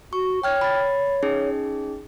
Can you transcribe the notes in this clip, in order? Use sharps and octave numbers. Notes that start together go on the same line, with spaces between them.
F#4 C#6
C#5 G5 F6 G#6
B5 A6
C#4 D#4 G#4